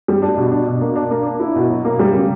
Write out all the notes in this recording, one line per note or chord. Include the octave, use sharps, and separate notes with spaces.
G3
D4
B2
D4
B2
A#3
D4
A#3
D4
E4
B2
F#3
A#3
G3
C#3